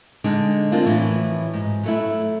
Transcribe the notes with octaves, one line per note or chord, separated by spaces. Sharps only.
D3 G#3 D4 D#4
A#3 C4 D4 F4
F2 A2 E3 F#3
G#2
F#3 A3 E4